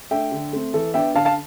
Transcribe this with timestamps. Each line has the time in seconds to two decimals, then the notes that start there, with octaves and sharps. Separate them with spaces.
0.11 A3 D4 E5 G5
0.32 D3
0.53 A3 C4
0.73 E3 A4
0.94 B3 D4 E5 G5
1.15 D3 F5 A5
1.25 F5 A5